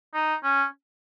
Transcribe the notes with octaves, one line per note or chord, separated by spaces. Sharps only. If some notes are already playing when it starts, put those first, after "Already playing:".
D#4
C#4